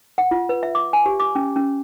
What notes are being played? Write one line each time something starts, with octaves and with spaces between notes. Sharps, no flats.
F#5
F4
B4
E5
D6
G#5
G4
D6
C#4
C#4